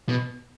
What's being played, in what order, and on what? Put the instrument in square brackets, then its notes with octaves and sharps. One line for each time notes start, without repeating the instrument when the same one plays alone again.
[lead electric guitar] B2